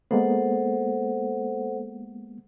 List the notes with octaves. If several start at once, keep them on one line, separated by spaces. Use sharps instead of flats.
G#3 A#3 B3 A4 C5 F#5